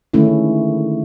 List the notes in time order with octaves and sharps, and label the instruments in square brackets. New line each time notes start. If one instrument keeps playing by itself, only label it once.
[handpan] D3 D#3 G#3 A3 C#4 E4